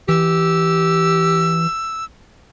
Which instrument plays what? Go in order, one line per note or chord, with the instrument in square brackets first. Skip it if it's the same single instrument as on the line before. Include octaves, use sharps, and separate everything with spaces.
[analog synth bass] E3 [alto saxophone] G4 [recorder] E6